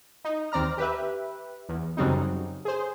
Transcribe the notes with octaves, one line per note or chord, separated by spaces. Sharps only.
D#4
D#2 C4 D5 A#5 F6
G4 B4 E5
E2
F#2 C#3 F#3 G3 C4 D#4
G#4 C5